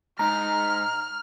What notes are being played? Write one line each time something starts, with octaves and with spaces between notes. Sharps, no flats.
G#2 D#4 A#5 F6